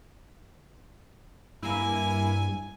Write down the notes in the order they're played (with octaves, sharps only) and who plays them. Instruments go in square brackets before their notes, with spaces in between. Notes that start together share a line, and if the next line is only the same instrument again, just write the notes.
[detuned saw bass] G2 [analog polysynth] A#3 E4 [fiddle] G#5